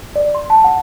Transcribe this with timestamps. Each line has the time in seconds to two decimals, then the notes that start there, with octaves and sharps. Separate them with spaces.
0.16 D5
0.35 C6
0.50 A5
0.64 F#5